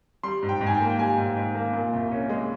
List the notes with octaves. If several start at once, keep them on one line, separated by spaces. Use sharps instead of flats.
G3 C6
G#2
G5
G#2
G#5
G5
A#3
G5
G3 G#5
G#2
G#2
A#3
A#2
C2
C#4
G#3